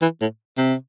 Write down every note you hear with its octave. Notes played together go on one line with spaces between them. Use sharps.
E3
A2
C3